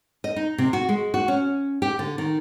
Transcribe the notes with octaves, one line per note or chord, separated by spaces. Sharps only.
D#5
D#4
C3
F#4
G#3
F#4
C#4
G4
D3
D#3